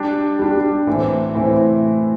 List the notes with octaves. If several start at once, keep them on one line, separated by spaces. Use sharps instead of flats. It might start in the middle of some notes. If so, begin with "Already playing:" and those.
Already playing: G3 D4 G4
G3 D4 G4
A2 E3 A3 C4 E4
A2 E3 A3 C4 E4